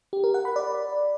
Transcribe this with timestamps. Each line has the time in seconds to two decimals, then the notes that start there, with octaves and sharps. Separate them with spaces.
0.13 G4
0.24 A#4
0.34 F#5
0.45 B5
0.56 D5